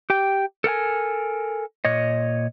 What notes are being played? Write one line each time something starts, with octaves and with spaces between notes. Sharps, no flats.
G4 G5
A4 A#4 F#5 G#5
A#2 C#5 D#5